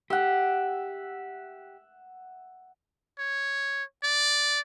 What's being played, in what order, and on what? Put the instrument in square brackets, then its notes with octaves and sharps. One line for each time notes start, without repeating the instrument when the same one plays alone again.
[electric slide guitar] G4 [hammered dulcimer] E5 F#5
[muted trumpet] C#5
D5